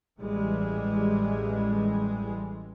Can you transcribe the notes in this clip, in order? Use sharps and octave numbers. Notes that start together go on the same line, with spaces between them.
A1 E3 G3 G#3